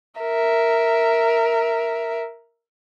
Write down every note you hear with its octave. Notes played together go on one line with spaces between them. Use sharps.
A#4 E5